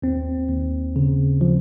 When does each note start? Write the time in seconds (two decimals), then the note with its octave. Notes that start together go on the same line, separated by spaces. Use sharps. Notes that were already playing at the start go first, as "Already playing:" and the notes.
0.02 D#2 C4
0.49 D#2
0.96 C#3
1.41 F3